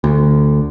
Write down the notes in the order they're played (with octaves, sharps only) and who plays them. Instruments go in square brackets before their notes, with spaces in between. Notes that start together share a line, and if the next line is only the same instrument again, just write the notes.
[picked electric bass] D2